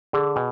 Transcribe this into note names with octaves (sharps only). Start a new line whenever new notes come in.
D3 G#4
B2 G#5